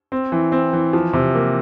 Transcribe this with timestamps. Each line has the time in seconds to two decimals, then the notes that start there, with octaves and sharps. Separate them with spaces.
0.12 C4
0.32 E3
0.52 C4
0.73 E3
0.93 F3
1.13 C3
1.35 A#3